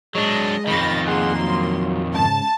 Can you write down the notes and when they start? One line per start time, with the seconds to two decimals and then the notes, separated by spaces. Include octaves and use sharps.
0.15 F#3 G#3 D4 D#5
0.67 F2 D#3 B5 A6 A#6
1.07 A#3 G#4 F#5 C6
1.40 F#3
2.14 G#2 C#3 A5